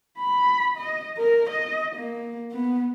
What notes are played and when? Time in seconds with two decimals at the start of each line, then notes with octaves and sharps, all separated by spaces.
0.19 B5
0.77 D#5
1.18 A#4
1.50 D#5
1.96 A#3
2.52 B3